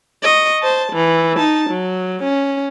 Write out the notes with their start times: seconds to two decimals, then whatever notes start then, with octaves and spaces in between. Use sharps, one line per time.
0.23 D#5 C#6
0.63 C5 A5
0.93 E3
1.37 D#4 A5
1.70 F#3
2.24 C#4